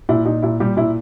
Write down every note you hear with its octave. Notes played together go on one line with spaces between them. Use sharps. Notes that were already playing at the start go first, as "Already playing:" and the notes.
A#2 E4
A#2 D#4
A#2 E4
A#2 G3 G4
A#2 E4